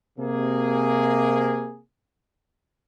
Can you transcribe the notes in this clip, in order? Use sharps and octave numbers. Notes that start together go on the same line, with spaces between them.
C3 A#3 G#4